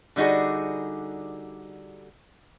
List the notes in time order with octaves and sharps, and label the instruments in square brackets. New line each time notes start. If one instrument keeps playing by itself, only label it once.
[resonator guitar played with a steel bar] D3 G3 D#4 F#4 G#4